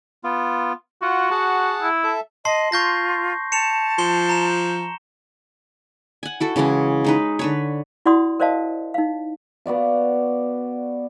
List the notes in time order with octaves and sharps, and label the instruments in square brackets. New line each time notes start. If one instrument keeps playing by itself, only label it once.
[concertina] B3 F4
[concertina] F4 F#5 [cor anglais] F#4
[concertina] G#4 F#5 A5
[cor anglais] E4
[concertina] A4 E5
[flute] D#5 [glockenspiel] A5 C6 C7
[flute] F4 [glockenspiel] C#6 G6 A#6
[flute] A5 [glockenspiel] C#7 E7 F7
[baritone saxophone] F3 [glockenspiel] G7
[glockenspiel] A#5 E7
[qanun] F#5 G#5
E4 F#4 A4
C#3 E3 G#3 C#4
G#3 D#4 B4
D3 B4 C#5
[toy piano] E4 F#4 D5 F#5 C6 D#6
A#4 C5 D5 D#5 F5 A5
D#4 F5
[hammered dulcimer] B3 F#4 D5 F5